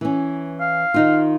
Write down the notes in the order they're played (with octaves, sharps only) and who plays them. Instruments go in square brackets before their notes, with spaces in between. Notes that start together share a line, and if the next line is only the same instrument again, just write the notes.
[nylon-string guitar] E3 C#4
[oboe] F5
[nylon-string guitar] D#3 D#4 F4